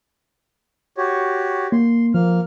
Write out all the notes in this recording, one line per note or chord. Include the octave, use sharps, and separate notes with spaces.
F#4 G4 C#5
A#3 C6
F3 A#3 F6